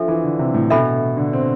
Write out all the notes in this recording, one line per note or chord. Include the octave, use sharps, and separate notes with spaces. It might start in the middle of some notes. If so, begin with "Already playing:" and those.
Already playing: F3 D4 A4 E5
E3
D3
C3
A2
B2 D4 A4 E5 B5
D3
C4